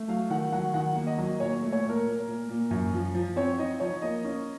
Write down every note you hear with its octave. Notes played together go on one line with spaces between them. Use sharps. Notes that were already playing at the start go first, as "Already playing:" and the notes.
Already playing: A3
F#3 F5
D#3 F#5
F#3 F#5
D#3 F#5
A#3
D#5
F#3
A#2 C#5
A3
C#5
A#2
A#4
A#2
A#2
A#2
F#2
F3
F3
C4 C#5
D#4 D#5
F3 C#5
A#3 D#5
C#4